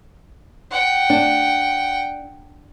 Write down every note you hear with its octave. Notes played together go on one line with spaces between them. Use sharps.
F#5 G5
D4